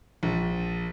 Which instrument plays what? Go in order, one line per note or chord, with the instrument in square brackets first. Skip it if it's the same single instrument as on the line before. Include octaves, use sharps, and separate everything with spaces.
[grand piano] A#1